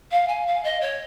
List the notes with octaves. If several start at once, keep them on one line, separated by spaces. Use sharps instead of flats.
F5
G#5
F5
D#5
C#5